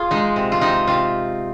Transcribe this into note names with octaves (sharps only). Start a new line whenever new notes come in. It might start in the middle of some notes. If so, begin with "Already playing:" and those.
Already playing: F4 G#4
G#3 D#4
C3
F4
C3 D#4
C3 F4